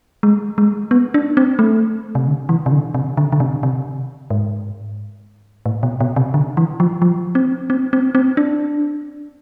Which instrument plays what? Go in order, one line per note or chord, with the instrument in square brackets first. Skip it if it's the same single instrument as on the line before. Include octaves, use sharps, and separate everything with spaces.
[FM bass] G#3
G#3
B3
D4
C4
A3
C3
D3
E3
C3
D3
C3
D3
D3
C3
C3
G#2
A2
B2
B2
C3
D3
E3
F3
F3
C4
C4
C4
C4
D4